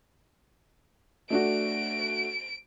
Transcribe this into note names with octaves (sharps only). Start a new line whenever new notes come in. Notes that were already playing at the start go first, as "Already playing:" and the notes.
A3 D4 F#4 D7